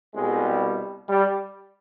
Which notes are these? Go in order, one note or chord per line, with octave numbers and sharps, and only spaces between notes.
C2 B2 G3 G#3
G3